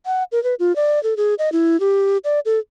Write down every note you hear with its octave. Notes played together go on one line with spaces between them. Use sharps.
F#5
A#4
B4
F4
D5
A4
G#4
D#5
E4
G4
D5
A4